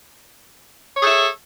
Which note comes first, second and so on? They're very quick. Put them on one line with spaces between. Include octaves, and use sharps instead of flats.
C#5 G#4 A4 E5